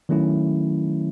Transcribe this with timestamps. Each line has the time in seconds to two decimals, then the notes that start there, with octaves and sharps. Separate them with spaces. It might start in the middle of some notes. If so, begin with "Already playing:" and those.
0.09 D#3 F#3 A3 C#4 E4